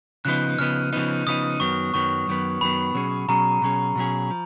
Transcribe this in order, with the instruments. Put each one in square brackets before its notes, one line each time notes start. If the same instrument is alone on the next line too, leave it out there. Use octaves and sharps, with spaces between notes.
[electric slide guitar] C#3 F3 B3 D#4 [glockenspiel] F#6
[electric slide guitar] C#3 F3 B3 D#4 [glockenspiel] F6
[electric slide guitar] C#3 F3 B3 D#4
[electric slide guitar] C#3 F3 B3 D#4 [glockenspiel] D#6
[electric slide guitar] F#2 D#3 F#3 B3 [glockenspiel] C#6
[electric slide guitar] F#2 D#3 F#3 B3 [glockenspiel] C#6
[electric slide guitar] F#2 D#3 F#3 B3
[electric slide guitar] F#2 D#3 F#3 B3 [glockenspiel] B5
[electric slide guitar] B2 F#3 C#4 G#4
[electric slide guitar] B2 F#3 C#4 G#4 [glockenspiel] A#5
[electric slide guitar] B2 F#3 C#4 G#4
B2 F#3 C#4 G#4
F3